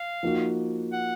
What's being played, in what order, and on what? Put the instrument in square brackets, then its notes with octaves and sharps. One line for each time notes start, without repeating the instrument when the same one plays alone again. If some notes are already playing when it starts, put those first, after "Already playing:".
Already playing: [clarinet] F5
[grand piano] F3 A#3 D#4 F#4
[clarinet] F#5